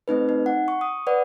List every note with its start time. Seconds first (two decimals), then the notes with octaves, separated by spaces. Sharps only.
0.08 A3 C4 D#4 B4
0.29 D#4
0.46 F#5
0.68 C#6
0.81 D#6
1.07 B4 D5 F#5